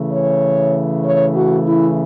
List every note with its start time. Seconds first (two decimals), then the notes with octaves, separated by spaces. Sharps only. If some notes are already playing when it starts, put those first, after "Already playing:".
Already playing: C#3 E3 A3
0.10 C#5
1.03 C#5
1.34 F#4
1.66 E4